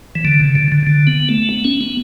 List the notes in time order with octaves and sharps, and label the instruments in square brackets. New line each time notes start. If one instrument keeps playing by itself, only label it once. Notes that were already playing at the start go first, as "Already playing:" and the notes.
[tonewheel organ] E3
D3
C#3
D3
D3
D3
B3
A3
B3
C#4
B3